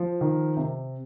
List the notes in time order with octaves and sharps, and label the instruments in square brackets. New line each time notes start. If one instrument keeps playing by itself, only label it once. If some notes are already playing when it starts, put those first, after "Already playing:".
Already playing: [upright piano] F3
D#3
C3